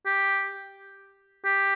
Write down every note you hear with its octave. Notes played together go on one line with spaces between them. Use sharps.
G4
G4